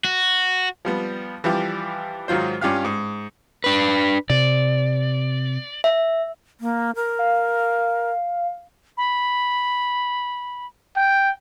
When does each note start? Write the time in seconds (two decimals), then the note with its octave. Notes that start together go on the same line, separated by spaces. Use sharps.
0.04 F#4
0.85 F3 G3 B3
1.44 E3 F3 G3 G4
2.28 G#2 D#3 F#3 F4 C5
2.61 G2 C#4 F4 G4 F5 F6
2.85 G#2
3.64 D4 B4
4.30 C3 D5
5.84 E5
6.60 A#3
6.95 A#4
7.19 F5
8.97 B5
10.97 G5